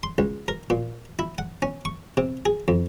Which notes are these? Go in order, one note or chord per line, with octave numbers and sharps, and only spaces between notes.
C6
C#2
A#4
A#2
E4
F#5
C#4
C#6
C3
G#4
F2